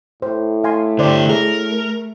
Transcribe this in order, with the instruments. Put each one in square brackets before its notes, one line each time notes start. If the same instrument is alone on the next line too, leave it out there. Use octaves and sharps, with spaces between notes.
[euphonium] A2 [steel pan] C5
[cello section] A3 [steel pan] F5 G#5 C6
[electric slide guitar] D3 G4 [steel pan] C5 D5
[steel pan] G#4 [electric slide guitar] A#4